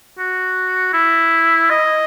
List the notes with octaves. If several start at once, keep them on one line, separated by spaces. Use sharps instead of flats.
F#4
E4
D#5